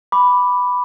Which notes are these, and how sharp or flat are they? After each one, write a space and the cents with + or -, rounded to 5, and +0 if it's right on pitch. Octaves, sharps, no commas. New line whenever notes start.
B5 +0 D6 +0